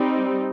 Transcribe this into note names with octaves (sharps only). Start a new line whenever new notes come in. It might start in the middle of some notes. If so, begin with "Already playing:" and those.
Already playing: G3 C4 D#4